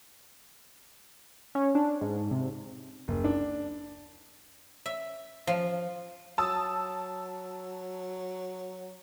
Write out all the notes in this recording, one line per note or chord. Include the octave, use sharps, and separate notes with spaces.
C#4
D4
G#2
C3
F#1
D4
E5
F3
F#3 A5 D#6 E6